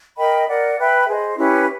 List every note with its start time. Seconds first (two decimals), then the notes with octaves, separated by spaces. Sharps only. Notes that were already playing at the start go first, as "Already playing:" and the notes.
0.17 A#4 D#5 G5 B5
0.47 A#4 D5 F#5
0.78 B4 E5 G5 B5
1.07 G#4 C5 D#5
1.36 C#4 E4 G4 B4